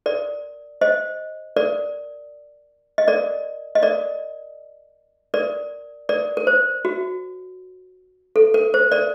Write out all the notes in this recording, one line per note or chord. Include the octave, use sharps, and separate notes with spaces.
A#4 D5
C5 D#5
A#4 D5
D#5
A#4 D5
D#5
A#4 D5
A#4 D5
A#4 D5
A#4
C5
F#4
A4
A#4
C5
A#4 D5